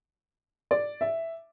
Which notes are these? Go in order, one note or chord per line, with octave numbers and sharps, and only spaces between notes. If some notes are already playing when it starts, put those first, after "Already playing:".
D5
E5